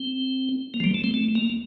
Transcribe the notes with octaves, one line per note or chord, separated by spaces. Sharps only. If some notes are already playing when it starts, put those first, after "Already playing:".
Already playing: C4
A#3
F3
G3
A3
C4
A3
A#3